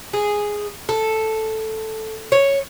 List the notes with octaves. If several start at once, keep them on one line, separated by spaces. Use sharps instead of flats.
G#4
A4
C#5